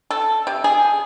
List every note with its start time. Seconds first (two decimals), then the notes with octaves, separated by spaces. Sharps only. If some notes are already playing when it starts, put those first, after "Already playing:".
0.11 A4
0.47 C3
0.64 G#4